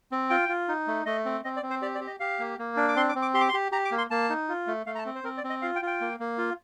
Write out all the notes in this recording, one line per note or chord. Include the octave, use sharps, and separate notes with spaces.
C4
F4 G5
F4
D#4
A3
A3 D#5
C4
C4 D#5
D5
C4
C5
G4 D5
D5
G4
D#5
G4 F5
A#3
A#3
D4
D6
C4 C6
D6
C4
D6
G4 C6
D6
C6
G4
G4 A#5
D6
A#3
C6
A#3 A5
D#4
F4
A3
A3 F5
A#5
A5
C4
C5
C4 A#4
D5
C4
D#5
F4 F5
G5
F4
G5
A#3
A#3
F4